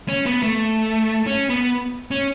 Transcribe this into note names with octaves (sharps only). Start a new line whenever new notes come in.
C#4
B3
A3
C#4
B3
C#4